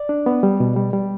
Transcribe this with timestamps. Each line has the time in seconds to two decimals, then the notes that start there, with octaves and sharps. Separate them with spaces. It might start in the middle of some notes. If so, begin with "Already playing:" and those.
Already playing: D5
0.09 D4
0.26 B3
0.43 G3
0.60 B2
0.76 G3
0.93 G3